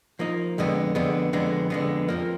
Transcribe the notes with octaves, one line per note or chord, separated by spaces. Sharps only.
F3 A#3 D#4
F2 D3 G#3 B3
F2 D3 G#3 B3
F2 D3 G#3 B3
F2 D3 G#3 B3
F2 F3 A#3